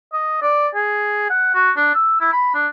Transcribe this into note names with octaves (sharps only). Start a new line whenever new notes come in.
D#5
D5
G#4
F#5
F#4
D4
E6
E4
B5
D4